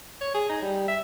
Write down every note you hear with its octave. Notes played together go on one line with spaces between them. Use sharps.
C#5
G#4
D#4
G3
E5